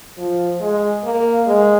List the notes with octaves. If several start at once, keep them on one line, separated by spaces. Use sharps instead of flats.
F3
G#3
A#3
G#3